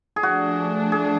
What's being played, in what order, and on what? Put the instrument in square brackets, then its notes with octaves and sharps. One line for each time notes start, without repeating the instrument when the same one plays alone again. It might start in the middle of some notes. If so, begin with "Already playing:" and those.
[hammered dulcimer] G#4
[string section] F3 A3 D4 [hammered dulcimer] F#4
[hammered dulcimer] G#4